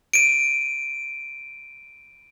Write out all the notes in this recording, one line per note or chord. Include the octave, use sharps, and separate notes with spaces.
D7 D#7